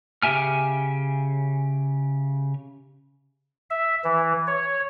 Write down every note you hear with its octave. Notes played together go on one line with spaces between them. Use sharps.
C#3 G4 E5 G#5 F6
E5
E3
C#5